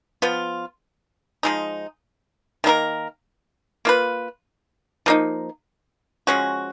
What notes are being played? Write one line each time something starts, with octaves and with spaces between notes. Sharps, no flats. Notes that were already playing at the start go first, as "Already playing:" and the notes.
F3 B3 F4
F3 G#3 D#4
D#3 A#3 D#4 A#4
A#3 F4 B4
F3 A#3 D#4
F3 G#3 C#4 F#4